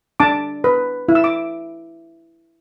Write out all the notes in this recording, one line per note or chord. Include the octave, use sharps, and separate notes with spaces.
D4 A5 D6
B4
E4
E6
D6